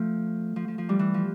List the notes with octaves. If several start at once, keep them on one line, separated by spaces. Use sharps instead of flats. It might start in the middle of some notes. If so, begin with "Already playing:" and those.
Already playing: F3 A3
F3
F3
F3
E3 G3
E3
F3